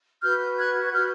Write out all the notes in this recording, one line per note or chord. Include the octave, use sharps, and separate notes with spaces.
F#4 B4 F6 G6
F#6 G#6
G#6
F#4 B4 F6 G6